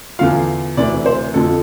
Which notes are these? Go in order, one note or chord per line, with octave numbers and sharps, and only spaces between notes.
E2 D3 F3 F5
D2 C3 E3 D5
C5
F2 D3 F3 A4